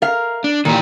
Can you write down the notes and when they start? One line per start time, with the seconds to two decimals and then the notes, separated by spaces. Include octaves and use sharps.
0.02 A#4 F5
0.44 D4
0.65 A#2 D#3 E3 G4